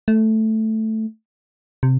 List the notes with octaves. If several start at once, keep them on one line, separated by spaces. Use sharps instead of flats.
A3
C3